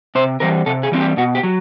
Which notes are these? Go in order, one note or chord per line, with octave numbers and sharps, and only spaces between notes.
C3 C5
E3 G3 C4 A#4
C3 A4
G#4
E3 G3 C4
G4
B2 F#4
G4
F#3